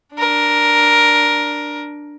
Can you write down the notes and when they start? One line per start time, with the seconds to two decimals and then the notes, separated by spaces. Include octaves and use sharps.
0.14 D4 A#4